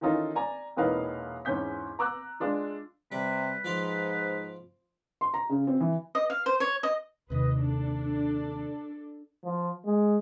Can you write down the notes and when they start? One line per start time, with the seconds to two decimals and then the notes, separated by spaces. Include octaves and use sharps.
0.01 D#3 E3 C#4 D#4 F4 A4
0.35 D5 G#5 A#5
0.76 E1 A#2 E3 D#4 B4 F5
1.45 E2 G#2 C#4 G6 B6
1.99 A#5 D6 E6 F#6
2.40 G#3 D4 F4
3.12 C3 G3 B4
3.64 G#2 F3 D5 C6
5.21 C6
5.34 A#5
5.49 C#3
5.67 C4
5.80 E3
6.15 D#5
6.30 F5
6.46 C5
6.60 C#5
6.83 D#5
7.30 D#2 C3 B4 D#5
7.59 D4 A4
9.44 F3
9.85 G#3